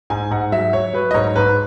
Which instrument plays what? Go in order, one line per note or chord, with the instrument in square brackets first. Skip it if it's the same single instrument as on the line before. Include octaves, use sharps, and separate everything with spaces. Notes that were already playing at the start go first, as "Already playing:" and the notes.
[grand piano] G#2 G#5
G#2 F#5
F#3 E5
F#3 C#5
F#3 B4
D#5
G#2 C#5
G#2 B4